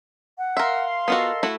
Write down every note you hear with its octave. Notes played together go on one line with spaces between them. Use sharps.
F#5
A#4 E5 F5 C6
B3 F4 F#4 A4 A#4 D#5
A3 E4 F#4